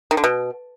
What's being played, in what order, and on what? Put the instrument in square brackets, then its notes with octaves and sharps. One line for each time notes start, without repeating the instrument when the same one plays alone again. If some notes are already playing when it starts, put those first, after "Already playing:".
[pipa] D#3
D3
B2